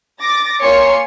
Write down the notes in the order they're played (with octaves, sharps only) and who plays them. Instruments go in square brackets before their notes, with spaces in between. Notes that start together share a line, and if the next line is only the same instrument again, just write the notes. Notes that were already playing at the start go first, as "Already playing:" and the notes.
[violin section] D6 A6 A#6
A#3 F4 C#5 G#5 C6 C#7